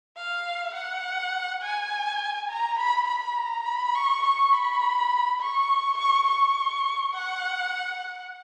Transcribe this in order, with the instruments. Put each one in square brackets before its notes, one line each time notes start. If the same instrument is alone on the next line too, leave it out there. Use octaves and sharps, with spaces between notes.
[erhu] F5
F#5
G#5
A#5
B5
B5
A#5
B5
C#6
C#6
B5
C#6
C#6
C#6
F#5